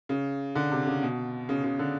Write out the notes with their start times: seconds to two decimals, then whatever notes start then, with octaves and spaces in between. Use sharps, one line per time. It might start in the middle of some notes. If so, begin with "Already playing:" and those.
0.09 C#3
0.55 D3
0.72 C3
0.87 C#3
1.02 B2
1.49 C#3
1.64 C#3
1.79 D3